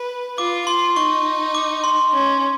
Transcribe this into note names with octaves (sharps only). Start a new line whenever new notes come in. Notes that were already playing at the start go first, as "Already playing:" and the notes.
Already playing: B4
F4 D6
F4 C6
D#4 C#6
D6
C6
C#4